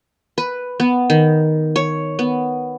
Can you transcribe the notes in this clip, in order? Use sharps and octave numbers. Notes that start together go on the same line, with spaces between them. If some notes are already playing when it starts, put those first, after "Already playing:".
B4
B3
D#3
C#5
B3